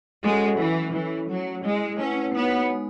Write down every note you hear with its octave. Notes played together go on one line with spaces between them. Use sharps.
G#3 C#4 F#4 A4 C#5 F#5
E3 F#3 C#4 E4 B4
E3 C#4 E4 A4 C#5
F#3 A3 C#4 F#4 C#5 F#5
G#3 E4 G#4 D#5
A3 C#4 E4 B4 F#5
B3 D#4 F#4 C#5 F#5
G#3 B3 D#4